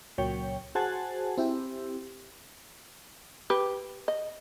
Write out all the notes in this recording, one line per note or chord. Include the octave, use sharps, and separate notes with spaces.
C#2 A#2 F#3 C#5 G5
F#4 G#4 C5 F#5 G#5 A5
C4 E4 G4
G4 B4
D#5